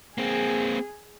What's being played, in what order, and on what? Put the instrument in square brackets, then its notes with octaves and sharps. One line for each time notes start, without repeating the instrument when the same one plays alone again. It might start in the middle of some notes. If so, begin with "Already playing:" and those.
[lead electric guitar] A#3 C4 [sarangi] G#4